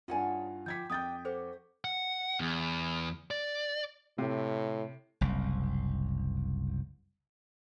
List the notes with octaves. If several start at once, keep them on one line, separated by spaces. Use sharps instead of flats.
G2 D#4 F4 G#4 C#5 F#5 G#5 A5
F3 D4 C5 G5 G6 G#6 B6
F2 D4 G4 D#5 G5 D#6 G6 A6
F#4 A4 C5 D5 C#6
F#5
E2
D5
A2 C3
F#1 C2